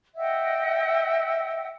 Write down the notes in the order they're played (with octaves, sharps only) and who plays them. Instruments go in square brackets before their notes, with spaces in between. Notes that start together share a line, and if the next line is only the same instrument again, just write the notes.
[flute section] D#5 E5 F#5 G5